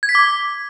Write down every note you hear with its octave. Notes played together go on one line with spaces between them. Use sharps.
G#6
B6
D6